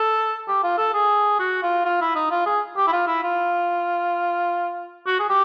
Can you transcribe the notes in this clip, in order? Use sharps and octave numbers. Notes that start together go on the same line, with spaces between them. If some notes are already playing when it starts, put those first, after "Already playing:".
Already playing: A4
G4
F4
A4
G#4
F#4
F4
F4
E4
D#4
F4
G#4
G4
E4
F4
E4
F4
F#4
G#4
G4